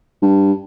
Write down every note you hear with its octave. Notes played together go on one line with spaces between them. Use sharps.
G2